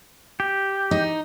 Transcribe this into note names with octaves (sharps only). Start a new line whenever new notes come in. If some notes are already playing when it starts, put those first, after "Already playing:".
G4
D#4